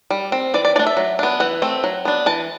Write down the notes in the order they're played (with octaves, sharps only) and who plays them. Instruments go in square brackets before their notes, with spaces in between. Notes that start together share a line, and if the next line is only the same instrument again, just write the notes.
[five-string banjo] G3
C4
E3 D5
D5
A3 D5
D4
E5
F#3
B3 D4
E3 F#5
A3 C4
F#3
B3 D4
E3 A5